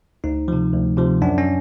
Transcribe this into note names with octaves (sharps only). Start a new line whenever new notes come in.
D2 D#4
C3 F3
D2
C3 F3
F#2 D4
C#4